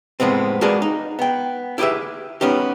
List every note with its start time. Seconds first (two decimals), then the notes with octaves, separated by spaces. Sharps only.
0.20 F2 A2 G#3 B3 C4
0.61 G#3 A#3 D4 F#4 G#4 B4
0.82 D#4
1.19 B3 G5
1.78 E4 G4 G#4 B4 E5
2.41 B3 C#4 D#4 G4